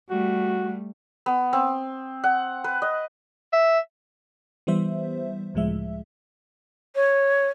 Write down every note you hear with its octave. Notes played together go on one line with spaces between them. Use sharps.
G3 A3 F#4
B3
C4
F#5
B4
D#5
E5
E3 G3 B3 C5 E5
C#2 A2 F3 G#3 E5
C#5